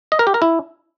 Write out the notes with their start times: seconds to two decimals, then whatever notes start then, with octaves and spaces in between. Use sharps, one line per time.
0.12 D#5
0.19 A#4
0.27 G4
0.34 A#4
0.42 E4